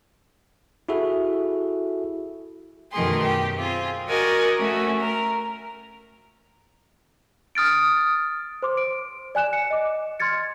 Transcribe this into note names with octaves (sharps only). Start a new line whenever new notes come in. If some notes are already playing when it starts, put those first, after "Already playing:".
E4 F#4 G#4 A4 E5
F#2 B2 D#3 A3 G#4 C6
G4
C4 F4 G#4
F#4 A#4 D5 D#5 G#5
A3 C#4 F#4
A#4
D#6 F6 A6 D7
C5 C6 D6
D7
D5 G#5 F#6 E7
C#7
D#5 D6
C6 F6 G#6 A6 C#7